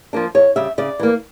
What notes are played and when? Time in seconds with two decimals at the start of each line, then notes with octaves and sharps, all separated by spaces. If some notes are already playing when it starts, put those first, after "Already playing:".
0.13 F3 A#3 D4
0.35 E2 C#5
0.56 C#3 G3 E5
0.78 C#3 D5
0.99 E3 A#3